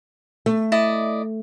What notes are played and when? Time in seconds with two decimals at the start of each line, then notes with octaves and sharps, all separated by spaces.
0.46 A3
0.72 E4 D5 D#5